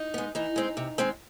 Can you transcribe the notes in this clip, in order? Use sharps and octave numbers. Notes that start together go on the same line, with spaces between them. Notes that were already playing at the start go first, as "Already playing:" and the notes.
Already playing: D#4
G#3 B3
E3 D#4
G#3 C4
C3
D#3 G#3 C4